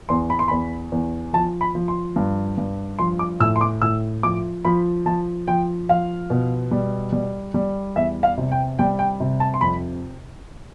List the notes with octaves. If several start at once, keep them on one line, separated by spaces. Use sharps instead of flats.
E2 C6
B5
C6
E2 B5
E2
F3 A5
B5
F3
C6
G2
G2
F3 C6
D6
A2 E6
C6
D6
A2 E6
F3 D6
F3 B5
F3 A5
F3 G5
F3 F5
B2
G3
G3
G3
E2 E5
F5
C3
G5
G3 G5
G5
C3
A5
C6
F2 B5